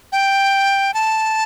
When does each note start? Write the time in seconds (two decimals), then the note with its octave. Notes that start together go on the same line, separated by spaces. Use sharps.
0.12 G5
0.94 A5